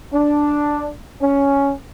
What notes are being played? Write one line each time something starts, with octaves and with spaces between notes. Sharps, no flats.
D4
C#4